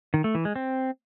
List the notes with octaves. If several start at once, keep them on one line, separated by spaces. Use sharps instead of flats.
D#3
A3
E3
G#3
C4